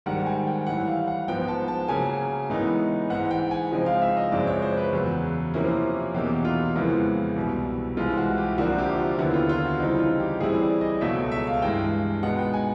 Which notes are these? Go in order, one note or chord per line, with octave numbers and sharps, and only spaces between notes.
G#2 D#3 G3 F#5
G#5
G5
A2 E3 G3 F#5
F5
F#5
G#2 F3 G#3 B3 G5
A5
A5
C#3 F#3 A#3 G#5
A2 E3 G#3 B3 D#4
G#2 E3 G#3 F#5
G5
G#5
C#3 F3 G#3 C4 D#4
F5
E5
D#5
F#2 C#3 F3 G#3 C4 D5
C#5
C5
B4
E2 C#3 F#3
C3 F3 A#3 C#4 E4
E2 B2 F#3 A#3 D#4 G4
F4
F2 C#3 E3 G#3 B3 E4
C2 B2 G3
C2 C3 E3 G#3 F4
F#4
G4
D2 C3 F3 A#3 D4 F#4
G4
F4
D#2 D3 F#3 B3 E4
F4
F4
F#4
C#3 E3 G3 C4 D#4 E4
F4
G4
A2 E3 G3 C4 E4 G#4
D5
D#5
C#2 B2 F#3 A3 E5
E5
F5
G2 E3 G#3 G5
B2 G#3 B3 D#4 F#5
G5
G#5